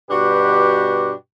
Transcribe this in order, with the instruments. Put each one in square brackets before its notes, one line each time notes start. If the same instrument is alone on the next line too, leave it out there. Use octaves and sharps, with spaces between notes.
[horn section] G2 B2 D4 F#4 G4 B4